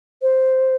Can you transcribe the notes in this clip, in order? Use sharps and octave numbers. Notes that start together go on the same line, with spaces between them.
C5